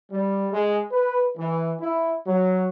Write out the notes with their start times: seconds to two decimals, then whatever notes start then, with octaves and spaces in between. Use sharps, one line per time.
0.10 G3
0.51 G#3
0.91 B4
1.37 E3
1.80 E4
2.26 F#3